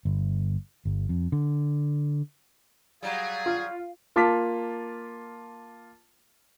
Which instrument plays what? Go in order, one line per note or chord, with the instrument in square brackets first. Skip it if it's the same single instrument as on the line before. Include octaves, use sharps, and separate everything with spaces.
[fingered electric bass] G1
G1
F2
D3
[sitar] F#3 G3 [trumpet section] G#4 [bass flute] F5
[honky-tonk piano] F4
[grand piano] A#3 F4 A5 D6 F6 B6